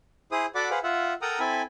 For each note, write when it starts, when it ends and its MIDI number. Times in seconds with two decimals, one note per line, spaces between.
0.32 0.46 64
0.32 0.46 68
0.32 0.46 72
0.32 0.46 87
0.55 0.69 66
0.55 0.69 69
0.55 0.69 74
0.55 0.69 78
0.55 0.69 83
0.55 0.69 86
0.70 0.79 68
0.70 0.79 71
0.70 0.79 72
0.70 0.79 77
0.70 0.79 78
0.83 1.14 65
0.83 1.14 76
0.83 1.14 78
1.22 1.39 69
1.22 1.39 70
1.22 1.39 78
1.22 1.39 79
1.22 1.39 82
1.22 1.39 87
1.39 1.62 60
1.39 1.62 64
1.39 1.62 69
1.39 1.62 80
1.39 1.62 83